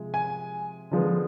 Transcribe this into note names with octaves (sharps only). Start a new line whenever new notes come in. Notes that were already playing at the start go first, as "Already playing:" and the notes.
Already playing: C3 F3 G#3
G#5
D3 F3 G#3 B3